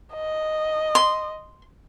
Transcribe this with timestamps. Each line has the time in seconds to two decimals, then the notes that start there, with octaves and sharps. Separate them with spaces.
0.14 D#5
0.95 C6